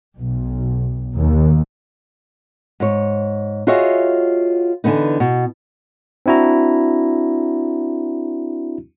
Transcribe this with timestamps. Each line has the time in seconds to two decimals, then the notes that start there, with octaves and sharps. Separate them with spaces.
0.18 B1
1.16 D#2
2.80 G#2 C#5
3.67 F4 F#4 G#4 C#5 D#5 E5
4.84 D3 E3 B3 D#4
5.20 B2
6.26 C4 D4 E4 F#4 A#5